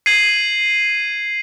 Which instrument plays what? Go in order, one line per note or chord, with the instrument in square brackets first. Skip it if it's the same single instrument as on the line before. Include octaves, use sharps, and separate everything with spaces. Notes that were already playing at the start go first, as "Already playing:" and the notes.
[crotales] G#6 C7 D#7 F#7